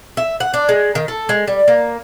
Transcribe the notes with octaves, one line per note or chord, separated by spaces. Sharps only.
E5
F#5
D4
G#3
D#3
A4
G#3
G3
A#3